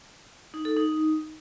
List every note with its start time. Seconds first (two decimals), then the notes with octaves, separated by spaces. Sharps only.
0.54 D#4
0.65 A4
0.77 D#4